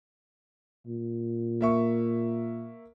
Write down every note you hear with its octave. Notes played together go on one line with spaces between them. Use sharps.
A#2
A#3 E5 C#6